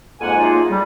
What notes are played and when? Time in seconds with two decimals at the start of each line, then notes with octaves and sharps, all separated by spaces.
0.21 F2 G#2 G#3 A#3 F#5 G#5
0.38 F#2 G#3 A#3 D#4 F4
0.70 G3